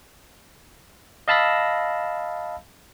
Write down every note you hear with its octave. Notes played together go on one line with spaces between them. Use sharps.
D#5 F5 A5 B5 E6 A#6